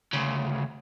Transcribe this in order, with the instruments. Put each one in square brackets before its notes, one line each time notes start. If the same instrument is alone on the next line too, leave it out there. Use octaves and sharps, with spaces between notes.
[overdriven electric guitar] D2 C#3